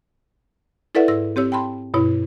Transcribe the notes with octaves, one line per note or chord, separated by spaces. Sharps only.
E4 A4 B4 D5 E5 F#5
G#2 E6 A#6
C4 G4 C#5 E6
G5 A5 B5 C6
G2 B2 E4 C#5